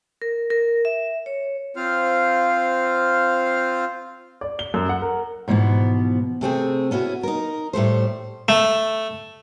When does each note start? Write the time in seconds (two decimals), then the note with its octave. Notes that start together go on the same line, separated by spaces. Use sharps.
0.22 A#4
0.50 A#4
0.85 E5
1.26 C#5
1.76 C4 F4 C5 F5 F6
4.41 D5
4.59 G7
4.74 F#2
4.89 F#5
5.01 A#4
5.48 G#2 B2 E3 F3 B3
6.41 C3 A3 C4 G#4
6.91 B3 C#4 E4 F#4
7.23 D#4 A#4
7.73 A2 G3 A3 C5
8.48 A3